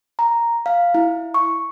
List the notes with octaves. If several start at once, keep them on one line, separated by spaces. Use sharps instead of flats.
A#5
F5
E4
C#6